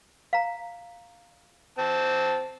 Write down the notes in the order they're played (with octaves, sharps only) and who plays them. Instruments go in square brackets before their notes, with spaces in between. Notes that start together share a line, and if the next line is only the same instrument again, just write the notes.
[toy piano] F5 A#5
[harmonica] C4 A5